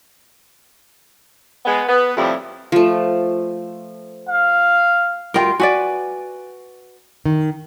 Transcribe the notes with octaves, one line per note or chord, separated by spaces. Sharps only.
G#3 B3
B3
F2 A2 C3 F3 G3 E4
F3 A3
F5
D2 G3 F4 A#4 G5
F#4 B4 D5 G#5
D#3